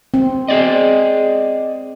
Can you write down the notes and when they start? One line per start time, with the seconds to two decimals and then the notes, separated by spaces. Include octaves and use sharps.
0.14 C4
0.48 G#4 D5 D#5